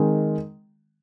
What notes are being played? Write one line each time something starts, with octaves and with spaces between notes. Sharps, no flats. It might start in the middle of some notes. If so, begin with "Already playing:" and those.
Already playing: D#3 G#3 C4